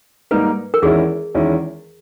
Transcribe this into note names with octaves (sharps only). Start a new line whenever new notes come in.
G#2 G3 A#3 D#4 A#4 B4
A#4
E2 D#3 G#3 C#4 E4 G#4
E2 D#3 G#3 C#4 E4